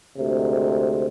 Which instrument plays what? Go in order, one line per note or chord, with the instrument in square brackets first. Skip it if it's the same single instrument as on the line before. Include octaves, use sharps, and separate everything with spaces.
[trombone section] D2 G#2 C3